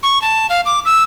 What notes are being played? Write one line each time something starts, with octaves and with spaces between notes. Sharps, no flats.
C#6
A5
F5
D6
E6